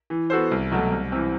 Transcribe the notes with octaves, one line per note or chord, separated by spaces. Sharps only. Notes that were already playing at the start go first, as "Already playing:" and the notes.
E3
B3 F#4 A4 C5
C2
B2 F#3 A3
C2
C3 E3